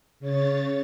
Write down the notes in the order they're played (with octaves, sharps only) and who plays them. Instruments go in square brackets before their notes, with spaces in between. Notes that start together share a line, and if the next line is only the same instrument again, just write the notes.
[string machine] C#3 C#5 A6